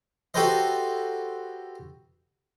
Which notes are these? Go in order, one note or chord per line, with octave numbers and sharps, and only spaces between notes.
F#4 G4 A4 B4 C5 D#5